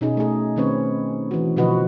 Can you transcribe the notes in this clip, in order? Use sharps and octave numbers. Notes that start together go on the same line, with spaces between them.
B2 C#4 D#4 G#4
A3 G#4
D#3 A3 C4 C#4 B4 C#5
E3 F#4
B2 D3 F3 F#4 B4 D#5